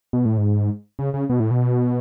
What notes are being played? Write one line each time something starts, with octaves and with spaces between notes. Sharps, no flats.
B2
A2
G#2
C#3
C#3
B2
A2
B2